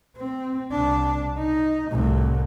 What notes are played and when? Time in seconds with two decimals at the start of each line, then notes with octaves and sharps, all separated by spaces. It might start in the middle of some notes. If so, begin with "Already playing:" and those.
0.17 C4
0.72 C2 D4
1.38 D#4
1.91 C2 A2